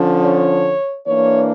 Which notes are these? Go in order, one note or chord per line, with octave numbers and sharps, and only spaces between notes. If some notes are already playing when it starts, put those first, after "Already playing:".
Already playing: D3 F3 C#4
C#5
E3 A#3 D4 C#5